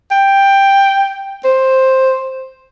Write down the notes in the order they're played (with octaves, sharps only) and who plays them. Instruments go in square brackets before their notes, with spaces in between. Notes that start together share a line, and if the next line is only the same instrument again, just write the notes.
[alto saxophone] G5
C5